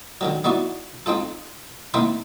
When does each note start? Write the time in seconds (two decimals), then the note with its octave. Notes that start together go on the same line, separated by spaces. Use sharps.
0.21 D3 D#3 F#3
0.44 B3 D#4 E4 F#4 D5
1.06 C4 D#4 F4 A4
1.94 A#3 C4 D#4 E4 B5 C6